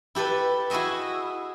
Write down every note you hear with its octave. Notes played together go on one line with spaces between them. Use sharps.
E4 G4 A4 B4
E4 F#4 G#4 D#5 E5